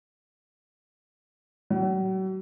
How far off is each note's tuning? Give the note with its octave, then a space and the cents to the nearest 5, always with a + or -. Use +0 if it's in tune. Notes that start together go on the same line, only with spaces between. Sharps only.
F#3 +40